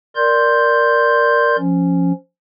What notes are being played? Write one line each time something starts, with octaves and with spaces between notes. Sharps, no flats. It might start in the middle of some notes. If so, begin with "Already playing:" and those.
A#4 D5 C6 G6
F3 C#4